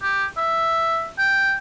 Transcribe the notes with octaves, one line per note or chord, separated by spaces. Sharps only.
G4
E5
G5